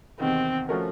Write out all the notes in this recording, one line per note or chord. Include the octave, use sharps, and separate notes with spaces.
E2 C3 D#3 C4
F3 A3 C#4 F#4 A#4